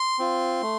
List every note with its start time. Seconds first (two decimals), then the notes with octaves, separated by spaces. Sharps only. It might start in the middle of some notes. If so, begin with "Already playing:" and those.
Already playing: C6
0.19 C4 F4
0.62 A3